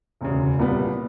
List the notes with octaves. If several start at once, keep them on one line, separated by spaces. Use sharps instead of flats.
E1 D2 C#3
C2 A#2 G3 B3